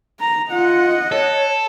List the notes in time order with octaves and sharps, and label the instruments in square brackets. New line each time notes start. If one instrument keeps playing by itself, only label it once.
[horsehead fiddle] A#5
[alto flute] F4 [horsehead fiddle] D#5 F#5
[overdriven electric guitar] A4 [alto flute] C#5